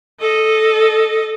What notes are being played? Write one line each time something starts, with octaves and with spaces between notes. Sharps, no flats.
A4 D#5